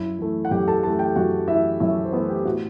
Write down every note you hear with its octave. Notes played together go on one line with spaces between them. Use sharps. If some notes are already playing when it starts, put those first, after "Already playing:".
Already playing: F#2 E4 E5
E3 A3
F#5
F#2 G4 G5
A4 A5
E3 A3 A4 A5
G4 G5
F#2 F#4 F#5
E3 A3 E4 E5
F#2 E4 E5
C5
E3 A3 B3 B4
G4
A2 F#4